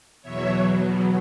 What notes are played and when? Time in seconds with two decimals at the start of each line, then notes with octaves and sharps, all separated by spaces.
0.22 E2 B2 F#3 C#5 E5